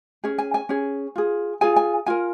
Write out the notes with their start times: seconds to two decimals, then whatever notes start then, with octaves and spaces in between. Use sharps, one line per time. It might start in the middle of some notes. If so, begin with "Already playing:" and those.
0.24 C#4 G#4
0.38 G#5
0.54 G#5
0.69 C#4 G#4
1.16 F4 G#4
1.61 F4 G#4 G#5
1.76 G#5
2.06 F4 A#4 G#5